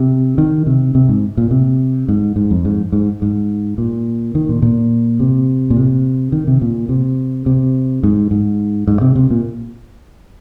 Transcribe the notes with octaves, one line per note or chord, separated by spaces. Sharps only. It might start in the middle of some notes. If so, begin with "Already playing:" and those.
Already playing: C3
D#3
C3
C3
G#2
A#2
C3
G#2
G#2
F2
G#2
G#2
G#2
A#2
D#3
A#2
A#2
C3
A#2
C3
D#3
C3
A#2
C3
C3
G#2
G#2
G#2
C3
C3
A#2